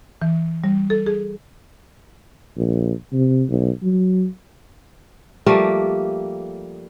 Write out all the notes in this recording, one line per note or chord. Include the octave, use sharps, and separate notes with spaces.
E3
G3
A4
G#4
A#1
C3
B1
F#3
F3 G3 A3 A#3